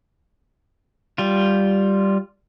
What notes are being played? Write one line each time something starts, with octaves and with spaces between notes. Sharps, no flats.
G3 F4